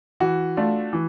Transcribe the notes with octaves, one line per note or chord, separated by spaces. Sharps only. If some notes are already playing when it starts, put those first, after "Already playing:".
E3 F#4
A3 D4 F4
E3